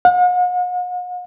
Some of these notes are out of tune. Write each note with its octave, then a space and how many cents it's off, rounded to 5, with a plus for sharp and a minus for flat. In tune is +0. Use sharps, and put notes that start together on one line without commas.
F#5 -45